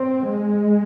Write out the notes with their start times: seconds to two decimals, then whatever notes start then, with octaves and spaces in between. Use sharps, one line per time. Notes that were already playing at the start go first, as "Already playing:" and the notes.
Already playing: C4
0.28 G#3